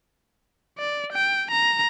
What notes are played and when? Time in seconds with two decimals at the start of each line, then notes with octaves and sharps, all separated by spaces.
0.78 D5
1.13 G5
1.51 A#5